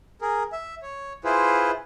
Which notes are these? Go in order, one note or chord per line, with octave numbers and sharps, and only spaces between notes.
G#4 A#4
E5
C#5
E4 F4 G#4 B4 C5